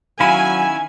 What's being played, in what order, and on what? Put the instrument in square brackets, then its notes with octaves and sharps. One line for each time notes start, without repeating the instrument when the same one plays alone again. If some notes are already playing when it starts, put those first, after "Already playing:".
[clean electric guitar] D#3 C#4 E4 [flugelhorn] F#3 [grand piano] F5 B5 D#7 [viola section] G#5